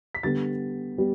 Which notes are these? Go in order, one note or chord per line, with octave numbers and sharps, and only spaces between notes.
B6
D3 G3 B3 A6
G3 B3